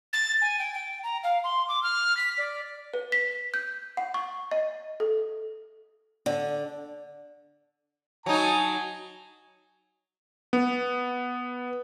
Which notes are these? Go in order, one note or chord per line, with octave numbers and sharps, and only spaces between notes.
A6
G#5
G5
G5
A#5
F5
C6
D6
F6
B6
D5
B4
B6
G6
F#5
C#6
D#5
A4
D3
F#3 D#4 G#5 A5
B3